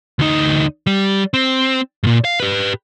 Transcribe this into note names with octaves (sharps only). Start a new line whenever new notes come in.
D2 D#4
G3
C4
G2 A#2
F5
G4 B4